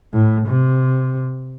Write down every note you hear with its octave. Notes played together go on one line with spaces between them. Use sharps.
A2
C3